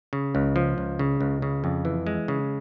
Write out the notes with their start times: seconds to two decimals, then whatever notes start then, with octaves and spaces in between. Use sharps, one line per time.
0.13 C#3
0.35 C#2
0.56 F3
0.78 C#2
0.99 C#3
1.21 C#2
1.42 C#3
1.64 F2
1.85 E3
2.07 G#3
2.28 C#3